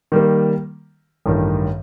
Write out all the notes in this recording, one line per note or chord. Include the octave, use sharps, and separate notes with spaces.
D#3 G3 A#3
A1 G2 D#3